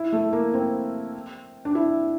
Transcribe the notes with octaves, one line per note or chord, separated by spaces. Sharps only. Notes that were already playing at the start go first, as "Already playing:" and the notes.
Already playing: E4
A3
A#3
C4
D4
E4